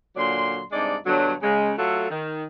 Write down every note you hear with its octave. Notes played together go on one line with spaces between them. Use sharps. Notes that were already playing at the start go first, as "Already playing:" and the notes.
A#2 D3 F#3 D5 C6
G2 C3 G#3 D#4 D5
G2 B2 D3 F#3
C#3 G#3
F#3 A3 F4 A4
D#3